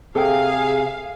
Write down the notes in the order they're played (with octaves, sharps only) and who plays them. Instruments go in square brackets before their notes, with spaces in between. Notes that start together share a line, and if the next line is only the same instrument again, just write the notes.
[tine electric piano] C3 [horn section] G#4 [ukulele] A4 G5 [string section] F5